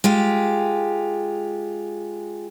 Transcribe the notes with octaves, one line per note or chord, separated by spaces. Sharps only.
G#3 F4 G4